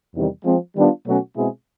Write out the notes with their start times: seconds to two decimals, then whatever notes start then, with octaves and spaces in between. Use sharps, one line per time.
0.14 E2 C3 D#3 G3
0.45 F3 G#3 C4
0.75 D#3 G3 B3 D4 F4
1.06 B2 F#3 A3 C#4 F#4
1.36 B2 G#3 C4 E4 G#4